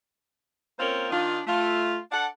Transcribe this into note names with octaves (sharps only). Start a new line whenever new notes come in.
A#3 C4 C#4 F4 A#4 C5
D#3 D4 D#4 F4
A3 F4
D4 A4 D5 F#5